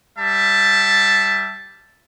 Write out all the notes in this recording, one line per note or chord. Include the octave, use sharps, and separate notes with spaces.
G3 E5 A5